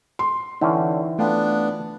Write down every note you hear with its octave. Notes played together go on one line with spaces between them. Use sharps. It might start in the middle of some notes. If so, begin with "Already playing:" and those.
C6
D3 E3 C#4 D#4 E5 G5
A3 B3 D4 F4 G5